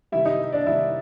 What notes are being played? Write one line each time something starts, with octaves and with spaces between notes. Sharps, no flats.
C3 D#3 G3 E4 E5
D#4 D#5
D4 D5
C3 D#3 G3 E4 E5